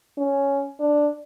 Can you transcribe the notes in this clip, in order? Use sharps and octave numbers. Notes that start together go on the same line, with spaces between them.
C#4
D4